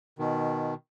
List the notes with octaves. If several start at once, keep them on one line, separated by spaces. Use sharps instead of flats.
B2 D#3